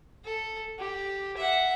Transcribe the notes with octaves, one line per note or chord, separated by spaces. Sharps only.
A4
G4
E5 F#5